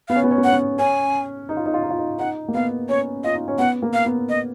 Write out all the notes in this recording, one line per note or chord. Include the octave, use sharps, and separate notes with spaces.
B3 F5
C#4
B3
C#4
B3
C#4 F#5
B3
C#4 G#5
D#4
F4
D#4
F4
D#4
F4
D#4
D#4 F#5
A#3
B3 F5
C#4 C#5
F4 D#5
D#4
C#4
B3 F#5
A#3
F5
B3
D#5